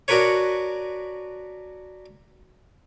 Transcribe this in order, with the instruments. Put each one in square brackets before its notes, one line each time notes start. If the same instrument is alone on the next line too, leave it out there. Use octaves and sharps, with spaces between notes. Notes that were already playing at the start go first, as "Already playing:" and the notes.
[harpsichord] D4 F#4 A#4 B4 C#5